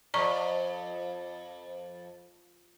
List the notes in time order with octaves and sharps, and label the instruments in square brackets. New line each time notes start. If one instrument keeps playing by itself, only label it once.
[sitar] F2 [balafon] D5 A#5 C#6